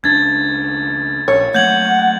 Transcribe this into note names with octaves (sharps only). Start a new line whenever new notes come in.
C#2 D4 G#6 A6
A#1 C#5
F#3 A3 A#3 F#5 G6 G#6 F#7